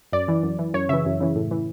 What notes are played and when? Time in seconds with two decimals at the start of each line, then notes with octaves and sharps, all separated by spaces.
0.12 F#2 D5
0.28 E3
0.43 F#2
0.59 E3
0.74 F#2 C#5
0.89 C#3 E3 E5
1.05 F#2
1.21 C#3 E3
1.36 A2
1.51 E3